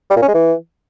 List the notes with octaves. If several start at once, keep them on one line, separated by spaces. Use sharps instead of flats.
G3
A#2
C#4
G#3
E3